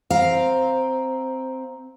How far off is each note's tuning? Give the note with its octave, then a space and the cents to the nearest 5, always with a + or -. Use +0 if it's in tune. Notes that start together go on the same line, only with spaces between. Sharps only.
C4 +0 F5 +0 A#5 +0